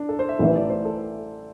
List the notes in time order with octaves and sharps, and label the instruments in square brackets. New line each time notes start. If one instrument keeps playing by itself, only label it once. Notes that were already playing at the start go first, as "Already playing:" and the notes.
Already playing: [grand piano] D4
A4
C5
E5
[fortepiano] A1 A2 E3 [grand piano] D5
[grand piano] D5
C5
A4